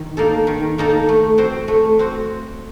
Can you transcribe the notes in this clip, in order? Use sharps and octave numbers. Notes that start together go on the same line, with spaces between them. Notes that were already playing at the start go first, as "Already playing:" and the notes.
Already playing: D#3
A#3 D#4 A4
D#3
A#3 D#4 A4
A3
C4 F#4 C5
A3
C4 F#4